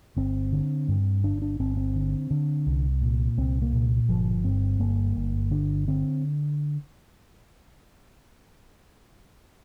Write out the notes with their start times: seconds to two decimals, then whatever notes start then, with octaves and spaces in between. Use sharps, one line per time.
0.17 G1 C4
0.52 D3
0.88 G2
1.24 G1 D4
1.42 D4
1.59 G1 C4
1.77 C4
1.95 D3
2.31 D3
2.67 C2
3.02 A#2
3.38 C2 C4
3.62 A#3
3.73 A#2
4.09 G1 F3
4.44 G2 C4
4.80 G1 A#3
5.16 G1
5.51 D3 D4
5.87 D3 C4